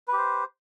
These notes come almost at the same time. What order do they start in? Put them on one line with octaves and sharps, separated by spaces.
B4 G4 C5